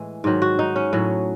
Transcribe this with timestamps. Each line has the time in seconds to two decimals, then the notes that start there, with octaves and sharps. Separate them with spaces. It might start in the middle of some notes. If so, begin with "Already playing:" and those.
Already playing: A2 E3 G#3
0.24 G#2 D#3 F#3
0.42 F#4
0.59 D#4
0.76 C#4
0.93 A2 F#3